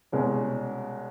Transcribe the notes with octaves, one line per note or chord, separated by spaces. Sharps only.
C2 B2 G#3 C#4